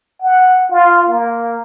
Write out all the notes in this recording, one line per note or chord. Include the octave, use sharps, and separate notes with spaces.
F#5
F4
A#3